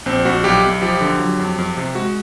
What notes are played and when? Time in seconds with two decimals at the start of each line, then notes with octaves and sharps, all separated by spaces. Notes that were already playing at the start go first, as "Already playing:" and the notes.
0.06 A#1 C4
0.25 A#1 F#4
0.44 B1 G4
0.63 B1
0.82 F3 G4
1.01 D3
1.19 F#3
1.39 F2
1.58 F2
1.77 C3
1.95 G#3 F#4